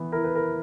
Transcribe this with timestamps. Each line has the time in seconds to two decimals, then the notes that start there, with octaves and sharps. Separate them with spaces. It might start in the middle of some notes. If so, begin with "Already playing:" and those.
Already playing: E3 B3
0.12 E4 A#4
0.24 B4
0.35 A#4